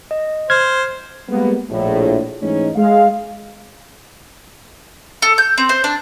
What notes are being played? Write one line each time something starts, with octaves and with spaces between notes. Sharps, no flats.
D#5
C5 F6 G#6
G3 G#3 A#3 B3
A#1 A2
G#2 E3 G#3 A3 C#4 D#4
G#3 F5
A4
G6
C4
C5
D4